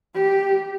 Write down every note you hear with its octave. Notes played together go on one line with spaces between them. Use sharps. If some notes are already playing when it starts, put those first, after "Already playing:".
G4